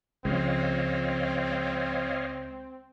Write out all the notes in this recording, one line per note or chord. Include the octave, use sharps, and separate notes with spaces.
C#2 F3 G#3 C4 C#5 D#5 F5